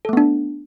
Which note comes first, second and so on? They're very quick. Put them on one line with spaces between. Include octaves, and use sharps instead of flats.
A4 A3 B3 D4